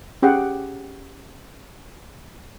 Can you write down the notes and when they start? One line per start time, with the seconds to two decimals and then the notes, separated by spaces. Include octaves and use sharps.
0.23 C#4 G4 G#4 F#5 G5